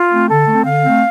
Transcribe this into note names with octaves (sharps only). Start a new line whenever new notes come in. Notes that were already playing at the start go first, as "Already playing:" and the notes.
Already playing: F4
A3 C4
D3 A4
A3 C4
D3 F5
A3 C4